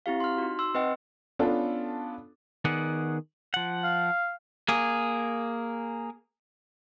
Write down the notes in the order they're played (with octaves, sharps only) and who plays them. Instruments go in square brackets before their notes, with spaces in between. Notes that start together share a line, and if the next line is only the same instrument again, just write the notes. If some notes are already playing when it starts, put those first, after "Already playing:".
[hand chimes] C4 E4 G4 F5
C6 F6
D#4 F#4
C6 E6
C4 B4 D#5 F#5 G5
[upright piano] B3 C#4 D4 F4 A4
[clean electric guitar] D#3 B3 G#4 D5 F#5
[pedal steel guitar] F3 F#5
[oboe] F5
[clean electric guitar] A#3 G#4